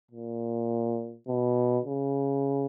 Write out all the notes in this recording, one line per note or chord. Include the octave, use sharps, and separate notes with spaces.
A#2
B2
C#3